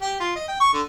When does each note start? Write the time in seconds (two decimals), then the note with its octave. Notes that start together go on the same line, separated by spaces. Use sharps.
0.01 G4
0.20 F4
0.35 D#5
0.48 G5
0.60 C#6
0.73 D3